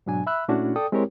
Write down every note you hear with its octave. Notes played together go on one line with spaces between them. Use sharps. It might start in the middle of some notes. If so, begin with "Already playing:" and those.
G#2 B2 F#3 D4 G#5
E5 B5 E6 F#6
A#2 A3 C#4 D4 E4 F#4
A4 D5 G5 D#6
G#3 C4 E4 G4 A#4 C#5